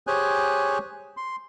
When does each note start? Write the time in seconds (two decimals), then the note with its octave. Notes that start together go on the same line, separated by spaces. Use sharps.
0.07 G4 G#4 C5 C#5 G#5 F#6
1.17 C6